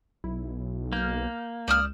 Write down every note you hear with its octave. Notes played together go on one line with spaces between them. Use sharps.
B1 E4
A#3 F6 G6
C#2 D5 D#6 F6 G6 E7